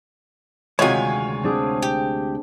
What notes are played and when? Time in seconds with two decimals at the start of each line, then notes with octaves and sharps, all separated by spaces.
0.79 D2 C3 D#3 G#3 F4 F#4 C#5 G#5
1.43 C4 D4 G#4
1.82 G4